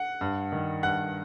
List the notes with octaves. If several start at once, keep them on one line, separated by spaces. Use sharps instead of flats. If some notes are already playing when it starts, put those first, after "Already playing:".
Already playing: F#5
G2
D#3
G2 F#5 F#6